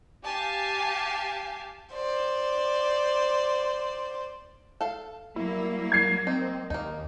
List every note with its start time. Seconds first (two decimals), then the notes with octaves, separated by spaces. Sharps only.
0.25 G4 F5 G#5 A5
1.93 C5 D5
4.81 A4 F5
5.36 F#3 G3 A#3 E4
5.92 G#6 C7
6.27 C4 D#4
6.70 D#2 A#3 D#4